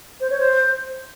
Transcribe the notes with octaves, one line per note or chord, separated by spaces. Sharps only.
C5
C#5
C5